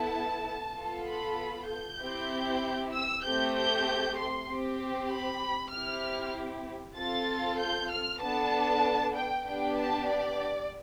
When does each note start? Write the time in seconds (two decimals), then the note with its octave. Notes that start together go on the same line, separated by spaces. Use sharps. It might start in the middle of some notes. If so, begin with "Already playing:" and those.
Already playing: B3 E4 A4 A5
0.76 B3 F4 A4
1.07 B5
1.69 G6
2.00 C4 E4 G4
2.93 E6
3.24 A3 C4 G4 G6
3.55 G6
4.17 C6
4.48 C4 G4
5.11 B5
5.72 C4 E4 G4 F6
6.97 C4 F4 A4 A6
7.60 G6
7.90 F6
8.21 B3 D4 A4 A5
9.15 G5
9.46 B3 D4 G4 G5
9.77 A5
10.07 D5